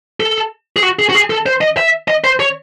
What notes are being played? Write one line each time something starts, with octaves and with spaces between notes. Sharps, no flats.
A4
G#4
F#4
G#4
F#4
G#4
A4
C5
D#5
E5
D#5
C5
C#5